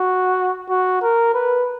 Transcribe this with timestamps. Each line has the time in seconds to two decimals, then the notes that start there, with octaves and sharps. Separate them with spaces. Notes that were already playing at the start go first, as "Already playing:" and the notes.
Already playing: F#4
0.69 F#4
1.02 A#4
1.34 B4